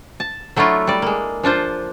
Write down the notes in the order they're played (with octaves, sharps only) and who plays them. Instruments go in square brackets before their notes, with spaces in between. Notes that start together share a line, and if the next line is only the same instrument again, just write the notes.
[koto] A5
F#3 A3 D4 E4 F4
G3 D5
G#3 A#3
F3 D4 F4 C5